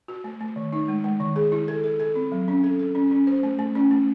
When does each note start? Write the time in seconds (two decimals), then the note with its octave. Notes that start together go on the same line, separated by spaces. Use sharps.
0.08 F#4
0.24 A3
0.41 A3
0.56 D#3
0.73 D#4
0.88 G#3
1.04 G#3
1.20 D#3
1.36 G#4
1.52 E4
1.68 A4
1.84 A4
2.00 A4
2.16 C4
2.32 F#3
2.48 C#4
2.64 A4
2.79 A4
2.95 C#4
3.11 C#4
3.27 C5
3.43 A3
3.59 A3
3.75 C#4
3.91 A3